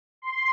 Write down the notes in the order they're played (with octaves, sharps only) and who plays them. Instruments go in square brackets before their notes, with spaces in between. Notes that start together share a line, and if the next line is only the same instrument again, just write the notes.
[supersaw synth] C6